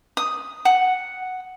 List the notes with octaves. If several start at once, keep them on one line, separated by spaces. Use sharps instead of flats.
D#6
F#5